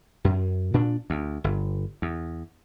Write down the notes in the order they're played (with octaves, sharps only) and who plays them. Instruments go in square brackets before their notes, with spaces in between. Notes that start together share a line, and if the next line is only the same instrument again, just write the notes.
[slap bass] F#2
A#2 D4
D2
G1
E2